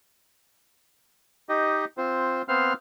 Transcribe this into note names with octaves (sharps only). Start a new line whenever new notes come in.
D#4 G4 D#5
C4 F4 C5
B3 C4 C5 F5 F6